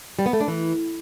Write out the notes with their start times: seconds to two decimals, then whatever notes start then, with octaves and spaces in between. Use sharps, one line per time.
0.19 G3
0.26 B3
0.33 A3
0.41 D4
0.48 E3